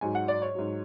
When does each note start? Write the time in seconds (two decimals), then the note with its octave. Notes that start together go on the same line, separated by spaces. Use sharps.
0.01 G#2 F#3 G#5
0.15 F#5
0.28 D5
0.42 C#5
0.55 G#2 F#3